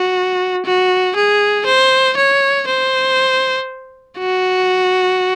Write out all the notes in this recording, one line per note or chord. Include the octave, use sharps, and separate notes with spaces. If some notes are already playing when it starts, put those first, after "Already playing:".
Already playing: F#4
F#4
G#4
C5
C#5
C5
F#4